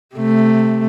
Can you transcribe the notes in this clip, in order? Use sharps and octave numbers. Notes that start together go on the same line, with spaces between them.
C3 A3